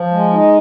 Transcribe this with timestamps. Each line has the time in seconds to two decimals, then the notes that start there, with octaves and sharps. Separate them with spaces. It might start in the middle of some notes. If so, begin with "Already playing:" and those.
Already playing: F3
0.11 G#3
0.32 D#4